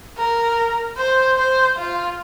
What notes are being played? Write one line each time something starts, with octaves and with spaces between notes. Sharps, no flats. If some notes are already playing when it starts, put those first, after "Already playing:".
A#4
C5
C5
F4